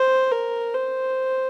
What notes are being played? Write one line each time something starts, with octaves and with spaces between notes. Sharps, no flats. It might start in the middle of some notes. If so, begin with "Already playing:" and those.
Already playing: C5
A#4
C5